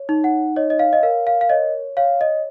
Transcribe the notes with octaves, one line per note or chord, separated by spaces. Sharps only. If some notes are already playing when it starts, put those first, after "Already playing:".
Already playing: C#5
D#4
F#5
C#5 D#5
D#5
F5
D#5
A#4 F5
F5
F5
C#5 D#5
C#5 F5
D#5